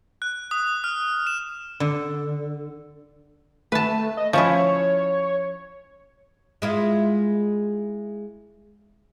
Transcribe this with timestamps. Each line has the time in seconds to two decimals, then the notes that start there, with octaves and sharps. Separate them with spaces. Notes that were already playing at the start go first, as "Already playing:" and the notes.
0.22 F#6
0.51 D#6
0.84 F6
1.27 E7
1.80 D3
3.72 A3 B4 A5
4.17 D#5
4.33 F3 C#4 E4 C#5
6.62 G#3 E4 F4